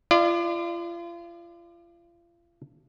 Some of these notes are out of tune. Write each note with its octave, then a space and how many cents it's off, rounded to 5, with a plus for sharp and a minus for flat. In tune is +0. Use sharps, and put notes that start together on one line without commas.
F4 -35 D5 +30